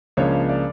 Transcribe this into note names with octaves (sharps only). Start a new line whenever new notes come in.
C#2 C#3 F3 A#3 D4 C#5
D5